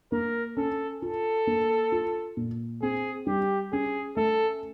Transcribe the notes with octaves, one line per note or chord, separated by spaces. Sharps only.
A#3 A#4
C#4 A4
F4 A4
A#3
F4
A#2
C4 G#4
G3 G4
C#4 G#4
A3 A4